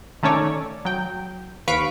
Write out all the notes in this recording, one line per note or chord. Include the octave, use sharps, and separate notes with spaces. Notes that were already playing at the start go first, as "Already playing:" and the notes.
D#3 A3 C#4 A4 C#5 D5
F#3 G5
D#2 B4 F5 C#6 B6 D7